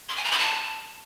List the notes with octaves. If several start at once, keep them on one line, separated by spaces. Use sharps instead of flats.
C6
G#5
A#5
B5
A5